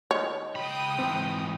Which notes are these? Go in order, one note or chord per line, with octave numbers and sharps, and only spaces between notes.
D#3 C#5 D#5
C#2 G5 B5 D#6
G#2 E3 C4